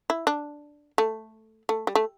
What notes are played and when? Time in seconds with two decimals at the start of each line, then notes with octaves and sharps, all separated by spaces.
0.10 E4
0.27 D4
0.98 A3
1.69 A3
1.87 G3
1.95 A3